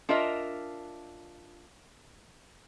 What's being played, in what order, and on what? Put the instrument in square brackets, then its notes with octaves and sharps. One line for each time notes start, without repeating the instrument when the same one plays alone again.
[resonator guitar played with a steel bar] D4 F4 A#4 D#5 E5